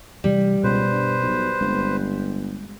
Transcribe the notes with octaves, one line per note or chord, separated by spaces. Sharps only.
C3 E3 G3 A3
C#2 B2 B4 C5
G2
B1
G1 G#3 C4